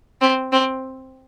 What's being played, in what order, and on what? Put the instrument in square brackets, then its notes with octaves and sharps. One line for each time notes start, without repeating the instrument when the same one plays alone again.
[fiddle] C4
C4